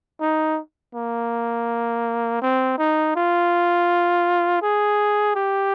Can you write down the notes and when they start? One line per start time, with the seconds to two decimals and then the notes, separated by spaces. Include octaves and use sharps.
0.21 D#4
0.94 A#3
2.42 C4
2.78 D#4
3.15 F4
4.62 G#4
5.35 G4